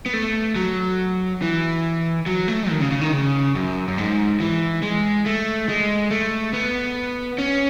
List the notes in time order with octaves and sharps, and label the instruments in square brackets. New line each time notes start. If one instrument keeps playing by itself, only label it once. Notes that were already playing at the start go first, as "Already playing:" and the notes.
[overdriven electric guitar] B3
A3
F#3
E3
F#3
A3
D#3
C#3
C#3
D#3
C#3
F#2
F#2
G#2
E3
G#3
A3
G#3
A3
B3
C#4